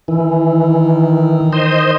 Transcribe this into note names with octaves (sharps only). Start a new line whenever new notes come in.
D#3 E3
C5 D#5